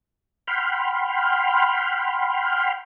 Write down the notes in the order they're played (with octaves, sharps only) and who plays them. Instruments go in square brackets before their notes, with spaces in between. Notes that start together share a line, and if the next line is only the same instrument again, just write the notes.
[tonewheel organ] F#5 G5 B5 C6 F6